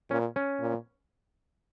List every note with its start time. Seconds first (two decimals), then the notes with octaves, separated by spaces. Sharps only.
0.11 A#2 C#4
0.36 C#4
0.60 A#2